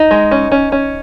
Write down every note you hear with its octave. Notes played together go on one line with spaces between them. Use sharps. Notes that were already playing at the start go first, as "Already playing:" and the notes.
Already playing: D#4
G#3
C#4
C#4
C#4